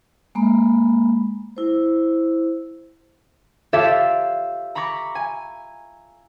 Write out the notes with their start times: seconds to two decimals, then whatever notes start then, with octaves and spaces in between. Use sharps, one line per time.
0.35 G#3 A#3 B5
1.57 E4 C5
3.73 F4 G4 A4 C#5 E5 F5
4.75 A#5 B5 C#6 D6 A#6
5.15 G#5